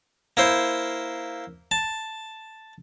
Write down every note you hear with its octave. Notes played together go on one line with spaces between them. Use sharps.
A#3 E4 C5
A5